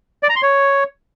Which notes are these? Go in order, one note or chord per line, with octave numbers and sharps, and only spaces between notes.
D5
A#5
C6
C#5